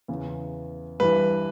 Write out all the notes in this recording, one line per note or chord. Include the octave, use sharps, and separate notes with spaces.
E2 C#3 E3
G2 E3 B4